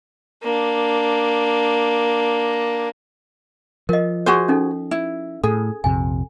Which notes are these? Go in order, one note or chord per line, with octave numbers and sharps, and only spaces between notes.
A#3 D4
F3 A#4 D#5
F#4 G#4 C5
C#4 D#4 A4
E4
A2 G#4 A4
A#1 F2 C3 G#5